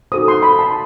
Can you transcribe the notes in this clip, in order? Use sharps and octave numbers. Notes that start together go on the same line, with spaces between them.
D#4 F#4 A4 C5 D#6
C6
B5
A5